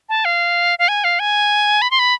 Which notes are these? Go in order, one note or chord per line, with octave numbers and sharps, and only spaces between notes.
A5
F5
F5
G#5
F5
G#5
B5
C6
B5